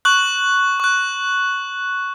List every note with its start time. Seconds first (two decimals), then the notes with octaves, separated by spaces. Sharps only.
0.05 C#6 F#6 F#7
0.80 C#6 F#6